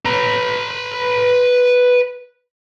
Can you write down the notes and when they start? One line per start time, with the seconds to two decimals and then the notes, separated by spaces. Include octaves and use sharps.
0.05 B4 A#5